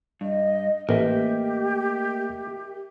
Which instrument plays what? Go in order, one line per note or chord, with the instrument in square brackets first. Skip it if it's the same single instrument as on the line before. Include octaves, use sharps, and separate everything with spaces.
[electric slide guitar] G2 [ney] D#5
[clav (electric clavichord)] A1 [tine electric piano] A3 A#3 [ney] G4 [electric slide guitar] A#4 D#5 E5